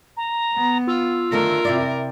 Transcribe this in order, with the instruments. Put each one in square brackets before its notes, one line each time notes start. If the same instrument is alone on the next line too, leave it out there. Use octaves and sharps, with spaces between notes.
[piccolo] A#5
[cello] B3
[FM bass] F4 [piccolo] E6
[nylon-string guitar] D3 D#3 A3 [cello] A#4
[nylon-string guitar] C3 E4 D5